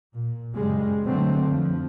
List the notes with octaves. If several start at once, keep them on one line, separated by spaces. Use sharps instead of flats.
A#2
F#2 C#3 G3 G#3
B2 D3 F#3 A3 C4
F2 F3